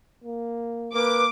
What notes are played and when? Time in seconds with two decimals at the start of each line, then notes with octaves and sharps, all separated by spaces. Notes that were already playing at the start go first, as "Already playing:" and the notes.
0.24 A#3
0.95 A#3 B4 D6